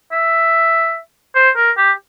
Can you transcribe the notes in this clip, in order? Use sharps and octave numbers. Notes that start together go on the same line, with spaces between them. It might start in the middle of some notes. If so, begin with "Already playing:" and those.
E5
C5
A#4
G4